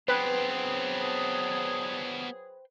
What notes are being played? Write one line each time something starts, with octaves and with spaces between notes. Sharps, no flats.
F#3 B3 D4 G#4 B4 C5 G5